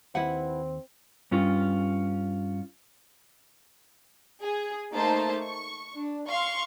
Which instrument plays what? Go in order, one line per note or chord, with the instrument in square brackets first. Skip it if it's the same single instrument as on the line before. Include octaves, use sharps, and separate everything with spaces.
[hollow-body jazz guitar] D#2 [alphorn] C4 [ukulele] E4 B4 F#5
[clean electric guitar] G2 C#4 F4
[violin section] G#4
A3 A#3 D#4 C5 A5
C#6
D4
F5 C6 C#6